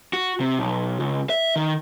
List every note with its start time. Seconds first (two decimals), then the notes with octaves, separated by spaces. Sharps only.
0.13 F#4
0.40 C3
0.59 B1
1.00 C#2
1.30 E5
1.56 D#3